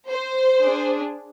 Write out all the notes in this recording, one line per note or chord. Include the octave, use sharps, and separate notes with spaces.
C5
D4 G#4